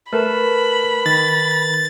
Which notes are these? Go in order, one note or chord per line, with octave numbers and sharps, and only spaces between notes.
A3 A#4 B4 A5 B5
D#3 A6